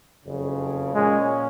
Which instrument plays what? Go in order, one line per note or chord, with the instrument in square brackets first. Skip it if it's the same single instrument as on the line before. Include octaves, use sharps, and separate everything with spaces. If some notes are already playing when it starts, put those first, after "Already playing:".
[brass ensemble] F#1 F2 C#3
[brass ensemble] A#2 F3 A#3 C#4 [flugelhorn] G#3